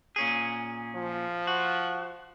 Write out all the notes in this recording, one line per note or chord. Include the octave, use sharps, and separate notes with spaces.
A#2 C#4 G#4
F3
F#4